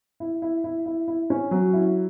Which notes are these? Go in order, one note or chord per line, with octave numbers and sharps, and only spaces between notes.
E4
E4
E4
E4
E4
C#4
F#3
E4